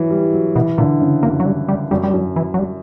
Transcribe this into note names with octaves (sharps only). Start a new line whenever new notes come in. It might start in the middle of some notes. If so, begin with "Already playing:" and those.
Already playing: E3 F#3
G3
F#3
B2 E3
A#2 D3
C#3
F#2 A#3
F#3
G3
G3
F#2 G3
G3
F#2 F#3
E3
F#3
G3